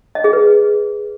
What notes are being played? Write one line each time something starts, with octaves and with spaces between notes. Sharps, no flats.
D#5
G#4
B4